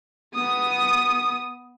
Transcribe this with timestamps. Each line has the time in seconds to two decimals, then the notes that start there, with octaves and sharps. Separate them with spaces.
0.35 B3 D#6